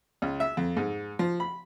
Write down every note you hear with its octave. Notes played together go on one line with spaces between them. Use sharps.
C#2
E5
F2
G#2
F3
B5